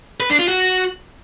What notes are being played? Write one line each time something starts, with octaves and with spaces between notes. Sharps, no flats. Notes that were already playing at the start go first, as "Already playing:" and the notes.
B4
D4
F4
F#4